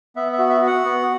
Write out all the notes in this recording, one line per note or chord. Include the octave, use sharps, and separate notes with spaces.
B3 E5
E5
F#4
E5
F#4
F#5
B3